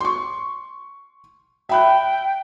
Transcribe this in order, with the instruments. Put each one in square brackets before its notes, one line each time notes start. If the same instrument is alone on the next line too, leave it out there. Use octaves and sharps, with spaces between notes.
[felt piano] C6 C#6
[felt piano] E5 B5 F#6 [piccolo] G5